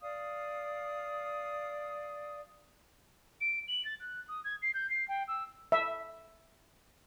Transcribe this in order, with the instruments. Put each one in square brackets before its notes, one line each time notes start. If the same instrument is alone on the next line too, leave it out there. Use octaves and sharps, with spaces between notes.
[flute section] D5 F5 D#6
[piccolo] D7
F#7
A6
F#6
D#6
G#6
C7
G6
C7
G5
E6
[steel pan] E5